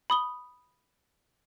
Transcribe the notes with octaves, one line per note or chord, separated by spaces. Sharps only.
B5 D#6 G7